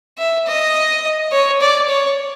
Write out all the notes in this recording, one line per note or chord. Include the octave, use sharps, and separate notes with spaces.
E5
D#5
C#5
D5
C#5